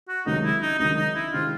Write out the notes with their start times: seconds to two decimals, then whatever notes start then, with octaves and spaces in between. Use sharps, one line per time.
0.09 F#4
0.26 C#2 C3 D#3 F#3 D#4
0.44 E4
0.62 D#4
0.79 C#2 C3 D#3 F#3 D#4
0.97 D#4
1.15 E4
1.33 C3 D#3 G#3 C4 E4 F4